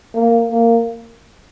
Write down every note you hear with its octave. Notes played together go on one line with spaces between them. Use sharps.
A#3
A#3